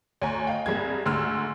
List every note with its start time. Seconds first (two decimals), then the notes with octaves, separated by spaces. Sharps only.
0.21 D2 C#5 G#5 A#5
0.47 D#5 F5 G5
0.66 C2 G2 A#3 G#4 G#6
1.06 D2 G#2 D3 C6 E6 F6